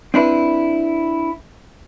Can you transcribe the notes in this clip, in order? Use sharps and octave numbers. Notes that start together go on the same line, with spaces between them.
C4 D4 E4 B4